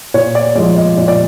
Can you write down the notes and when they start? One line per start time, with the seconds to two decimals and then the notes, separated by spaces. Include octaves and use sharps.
0.14 A#2 C#5
0.35 D5
0.55 F3 G#3 D5
0.76 D#5
0.97 A#2
1.08 D5